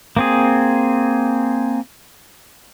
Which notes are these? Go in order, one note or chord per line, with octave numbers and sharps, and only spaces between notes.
A#3 C4 G#4